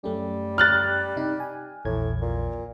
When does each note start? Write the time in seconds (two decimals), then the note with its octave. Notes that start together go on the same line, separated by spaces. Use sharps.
0.04 F#2 G3 A3 C#4
0.58 F6 F#6 A6
1.16 C3 D#4
1.40 G#5
1.85 A#1 E2 A2 G#6
2.21 A#2